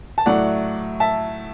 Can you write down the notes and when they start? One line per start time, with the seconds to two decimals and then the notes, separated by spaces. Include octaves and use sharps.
0.18 A5
0.26 A2 F#3 A3 D5 F#5
1.00 E5 A5